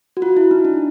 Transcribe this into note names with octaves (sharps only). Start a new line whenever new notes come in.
F#4
F4
E4
D#4
D4